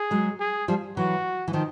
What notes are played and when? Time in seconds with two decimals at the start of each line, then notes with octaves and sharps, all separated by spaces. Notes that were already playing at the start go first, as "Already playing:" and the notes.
Already playing: G#4
0.11 F#3 G#3
0.40 G#4
0.68 F3 G3
0.97 E3 F#3 F#4
1.48 E3
1.53 D#3 F3